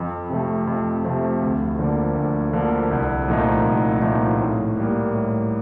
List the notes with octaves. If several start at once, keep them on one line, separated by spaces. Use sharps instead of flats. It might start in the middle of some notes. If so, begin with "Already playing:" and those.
Already playing: F2
C3 F3 A3
F2
C3 F3 A3
D2
D3 F3 A#3
D2
D3 F3 A#3
C2
A#2 F3 A3 D#4
C2
A#2 F3 A3 D#4
A2
G3 A#3
A2